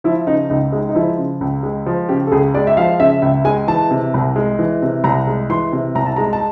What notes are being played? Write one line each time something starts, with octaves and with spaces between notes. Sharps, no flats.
F3 E4
C#3 D#4
C#2 D#4
G#3 D#4
D#4
F3 E4
C#3
C#2
G#3
F3
C#3 G4
A4
C#2 G#4
G#3 D5
E5
F3 F5
C#3 E5
C#2 E5
G#3 G#5
E3 A5
C3
C2
G#3
E3
C3
C2 A#5
G#3
E3 C6
C3
C2 A#5
A5
G#3 A#5
A5